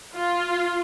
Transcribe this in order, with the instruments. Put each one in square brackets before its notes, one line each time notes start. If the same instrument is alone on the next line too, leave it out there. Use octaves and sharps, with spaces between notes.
[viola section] F4